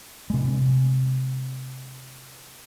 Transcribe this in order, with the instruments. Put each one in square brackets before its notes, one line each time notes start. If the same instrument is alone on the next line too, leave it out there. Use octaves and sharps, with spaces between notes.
[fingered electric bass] C3 G#3